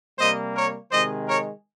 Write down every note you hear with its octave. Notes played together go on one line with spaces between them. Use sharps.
C3 G3 A#3 C5 D#5
A#4 C#5
C3 D#3 G#3 C5 D#5
A#4 C#5